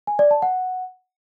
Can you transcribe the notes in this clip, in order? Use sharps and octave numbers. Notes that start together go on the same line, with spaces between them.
G#5
D5
A5
F#5